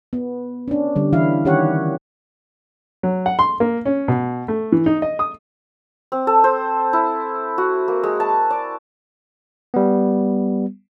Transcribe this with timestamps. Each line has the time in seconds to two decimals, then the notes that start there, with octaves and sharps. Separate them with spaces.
0.13 B3
0.68 C#4 D4
0.96 D3 G3
1.13 E3 E4 F5
1.45 D#3 C#4 G4 C#5 F#5
3.03 F#3
3.26 F#5
3.39 C6
3.60 A#3
3.85 C#4
4.08 B2
4.48 A3
4.72 E3
4.86 D#4
5.02 D#5
5.19 D#6
6.12 C4
6.27 A4
6.44 C5
6.93 E4
7.58 F#4
7.88 A#3
8.03 G#3
8.20 A5
8.50 D5
9.74 G3 B3